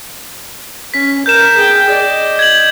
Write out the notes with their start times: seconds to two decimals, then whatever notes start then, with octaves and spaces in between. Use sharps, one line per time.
0.94 C#4 B6
1.26 A#4 G6 E7
1.56 G#4 G5
1.89 D5 D#5
2.39 G#6 F#7